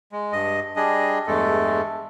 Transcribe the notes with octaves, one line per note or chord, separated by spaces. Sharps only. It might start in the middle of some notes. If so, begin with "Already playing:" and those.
G#3
G2 D#5
G3 D4 G#4 D#5
E2 G2 G#3 A3 A4